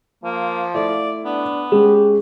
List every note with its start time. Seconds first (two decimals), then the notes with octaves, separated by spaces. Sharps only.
0.24 F3 A#3
0.74 A3 E4 D5
1.25 B3 D4
1.72 G#3 C#4 G4 G#4